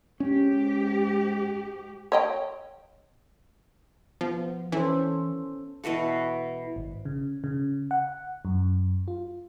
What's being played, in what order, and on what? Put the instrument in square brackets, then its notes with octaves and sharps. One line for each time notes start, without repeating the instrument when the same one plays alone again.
[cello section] G#2 G4 [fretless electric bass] C#4
[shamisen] C#5 D#5 G5
[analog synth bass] F3 [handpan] B3
[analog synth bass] E3 [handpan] C#4 A4 C5
[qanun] B2 E3 F#4 A4
[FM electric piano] G#1
C#3
C#3
F#5
F#2
F4